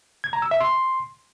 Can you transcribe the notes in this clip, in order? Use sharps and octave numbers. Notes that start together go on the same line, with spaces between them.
G#6
A#5
E6
E5
C6